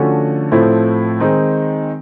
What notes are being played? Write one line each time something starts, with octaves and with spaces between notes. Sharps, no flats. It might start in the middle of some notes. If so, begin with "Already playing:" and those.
Already playing: D3 F3 A3 C#4 F#4
A2 F3 A3 C4 E4
D#3 G#3 C4 D#4